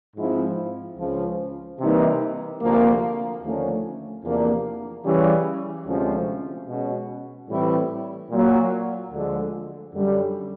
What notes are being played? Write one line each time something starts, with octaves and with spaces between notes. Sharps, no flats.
G#2 F3 G#3 C4 E4
C#2 C#3 F3
C3 E3 G3 A#3 D#4
D2 C3 F3 A#3
D#2 D3 F3 A3 C#4
E2 C3 F3 A#3 D4
C#3 E3 G3
D2 C3 F3 G#3 C#4
B2 G#3 C#4 F#4
A2 E3 G3 C4 E4
A#2 F#3 A#3
D2 D3 F3 G#3
F#2 D3 G3